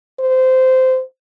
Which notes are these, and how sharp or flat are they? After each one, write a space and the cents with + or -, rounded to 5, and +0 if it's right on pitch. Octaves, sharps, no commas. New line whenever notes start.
C5 -15